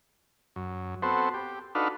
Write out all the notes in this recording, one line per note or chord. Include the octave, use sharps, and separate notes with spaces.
F#2
B3 C4 F#4 A4 C5
G4
D4 D#4 F#4 A4 B4 F5